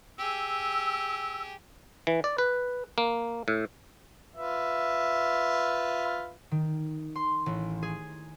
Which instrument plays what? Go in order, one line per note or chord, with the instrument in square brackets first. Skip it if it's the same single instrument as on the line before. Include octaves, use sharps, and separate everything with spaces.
[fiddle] G4 G#4 [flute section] E6
[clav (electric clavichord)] E3
D5
B4
A#3
A2
[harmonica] F4 B4 E5
[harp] D#3
C6
A1
G#4